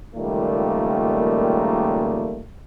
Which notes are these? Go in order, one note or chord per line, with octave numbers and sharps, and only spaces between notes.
C#2 A#2 D#3 G3 A3 A#3